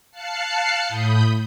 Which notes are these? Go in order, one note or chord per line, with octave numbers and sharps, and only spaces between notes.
F5 A5 F#6 C7 C#7
A2 B5 D#6 G6